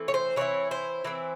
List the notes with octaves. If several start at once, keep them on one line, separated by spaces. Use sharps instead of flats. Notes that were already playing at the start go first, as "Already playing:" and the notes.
Already playing: E3 A3 C4 E4
C#5
C5
E3 A3 C4 E4 C#5
C5
E3 A3 C4 E4